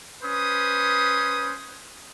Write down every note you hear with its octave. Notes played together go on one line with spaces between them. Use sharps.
C#4 B4 C5 D#6